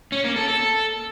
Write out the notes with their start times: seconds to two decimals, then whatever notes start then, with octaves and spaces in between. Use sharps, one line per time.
0.12 C#4
0.24 A#3
0.36 A4
0.48 A4